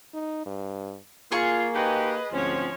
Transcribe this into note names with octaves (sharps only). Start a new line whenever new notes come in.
D#4
G2
A#3 F4 G#4 C#6
D#4 F#4 G4 B4 D#5
D2 G#2 F3 C4 C#4 C#5